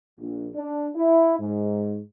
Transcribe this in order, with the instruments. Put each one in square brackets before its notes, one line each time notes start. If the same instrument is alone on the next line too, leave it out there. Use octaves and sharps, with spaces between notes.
[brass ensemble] A#1
D4
E4
G#2